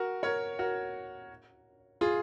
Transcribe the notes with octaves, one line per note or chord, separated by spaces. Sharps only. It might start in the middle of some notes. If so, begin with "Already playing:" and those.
Already playing: F#4 A#4
A#4 C#5
F#4 A#4
F4 G#4